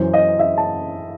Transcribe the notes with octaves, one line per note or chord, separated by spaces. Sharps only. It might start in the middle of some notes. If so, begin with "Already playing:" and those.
Already playing: F#2 E3 C5
D#5
E5
A5